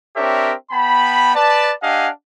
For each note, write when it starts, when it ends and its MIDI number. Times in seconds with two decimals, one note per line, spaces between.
0.16 0.53 60
0.16 0.53 62
0.16 0.53 67
0.16 0.53 70
0.16 0.53 73
0.16 0.53 76
0.71 1.34 59
0.71 1.34 79
0.71 1.34 81
0.71 1.34 83
1.34 1.72 71
1.34 1.72 74
1.34 1.72 81
1.82 2.08 62
1.82 2.08 67
1.82 2.08 75
1.82 2.08 77
1.82 2.08 78
1.82 2.08 80